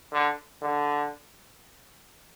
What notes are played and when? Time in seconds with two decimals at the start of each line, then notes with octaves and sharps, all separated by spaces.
0.12 D3
0.62 D3